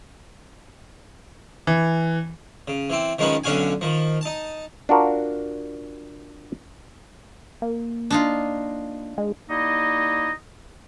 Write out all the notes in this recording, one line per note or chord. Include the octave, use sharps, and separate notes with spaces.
E3
C#3
E3 C4
D#3 F3 G#3 C#4 D#4 B4
B1 D3 C#4 F#4 F5 G#5
D#3 F3
D#4 A5
D4 F4 F#4 A#4
A#3
D4 D#4 F4
G#3
G3 A#3 D#4 E4 D#5